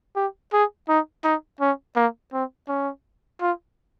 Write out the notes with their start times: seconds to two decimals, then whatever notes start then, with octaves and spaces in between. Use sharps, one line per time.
0.16 G4
0.53 G#4
0.89 D#4
1.24 D#4
1.61 C#4
1.96 A#3
2.33 C4
2.68 C#4
3.41 F4